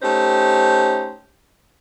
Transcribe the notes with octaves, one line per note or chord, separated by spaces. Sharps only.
A3 C#4 D#4 G4 C5